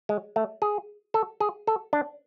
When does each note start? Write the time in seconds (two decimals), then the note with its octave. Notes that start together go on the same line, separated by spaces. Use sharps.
0.09 G#3
0.36 A3
0.62 G#4
1.14 A4
1.40 G#4
1.67 A4
1.93 D4